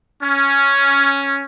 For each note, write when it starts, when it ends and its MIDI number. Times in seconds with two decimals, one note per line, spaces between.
0.22 1.43 61